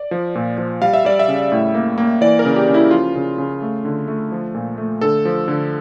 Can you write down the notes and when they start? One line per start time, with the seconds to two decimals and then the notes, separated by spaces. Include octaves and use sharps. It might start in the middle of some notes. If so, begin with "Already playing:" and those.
Already playing: D5
0.11 F3
0.35 A#2
0.58 F3
0.82 G3 F5
0.93 E5
1.05 G3 D5
1.19 E5
1.28 C#3
1.52 A2
1.74 A#3
1.98 A#3
2.21 E3 D5
2.39 A#4
2.45 C#3
2.56 G4
2.68 C#3
2.74 E4
2.91 F3 F4
3.15 C#3
3.38 C#3
3.62 A3
3.85 D3
4.08 A3
4.32 F3
4.55 A#2
4.78 A3
5.01 D3 A4
5.25 F3
5.48 D3